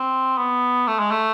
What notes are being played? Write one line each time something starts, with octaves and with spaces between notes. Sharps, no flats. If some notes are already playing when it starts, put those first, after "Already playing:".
Already playing: C4
B3
A3
G#3
A3